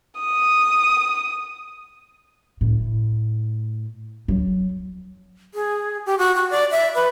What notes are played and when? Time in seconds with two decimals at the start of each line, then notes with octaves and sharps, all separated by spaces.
0.21 D#6
2.61 A2
4.28 F#3
5.54 G#4
6.06 G4
6.18 F#4
6.36 F#4
6.51 D5
6.71 E5
6.95 B4